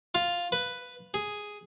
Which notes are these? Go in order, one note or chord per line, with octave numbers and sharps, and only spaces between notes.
F4
B4
G#4